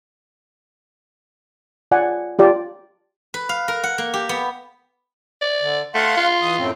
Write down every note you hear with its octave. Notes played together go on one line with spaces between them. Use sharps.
F4 D5 F#5 G#5
F4 G4 D5
B4
F5
A#4
F#5
A#3
G4
B3
D5
D3
A3 F5 F#5 C6
F4
E3 D#6
F#2 A2 C4